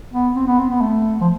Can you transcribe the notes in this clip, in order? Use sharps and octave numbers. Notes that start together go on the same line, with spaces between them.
B3
C4
B3
C4
B3
A3
F3